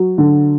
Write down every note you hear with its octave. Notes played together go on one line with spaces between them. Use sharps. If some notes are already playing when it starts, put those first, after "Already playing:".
Already playing: F#3
D3